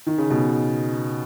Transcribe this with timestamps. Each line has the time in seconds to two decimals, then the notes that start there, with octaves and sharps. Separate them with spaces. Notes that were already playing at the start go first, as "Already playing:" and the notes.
0.06 D#3
0.18 C#3
0.30 B2